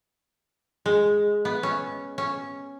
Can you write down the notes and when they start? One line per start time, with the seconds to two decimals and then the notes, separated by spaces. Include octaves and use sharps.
0.86 G#3
1.45 B3
1.63 C#4
2.18 C#4